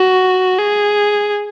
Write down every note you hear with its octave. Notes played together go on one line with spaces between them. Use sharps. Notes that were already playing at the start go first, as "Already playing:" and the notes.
Already playing: F#4
G#4